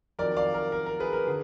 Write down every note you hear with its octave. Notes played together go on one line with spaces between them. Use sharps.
F2 D#3 F#3 A#4 D5
D5 F5
A#4
A#4
A#4
G#4 B4
A#4
D3 G#4